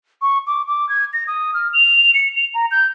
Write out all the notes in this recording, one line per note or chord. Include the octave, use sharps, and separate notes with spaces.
C#6
D6
D6
G#6
A#6
D#6
F6
F7
C#7
F7
A#5
G6